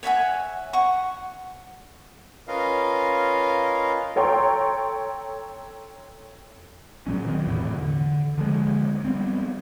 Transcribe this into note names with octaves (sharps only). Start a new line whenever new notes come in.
C#5 E5 F#5 G#5
F#5 C#6
C#4 F4 A#4 B4 D#5 F5
A4 C#5 G5 A#5 C6
A#2 F#3 C#4
D#3 C4
E2 A2 C3 E3
D3
D3 F3 G3 G#3
G3 B3 C4